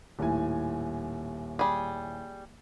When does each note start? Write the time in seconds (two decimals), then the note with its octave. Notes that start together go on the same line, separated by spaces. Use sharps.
0.19 D#1 A2 G#5
1.59 G3 G#4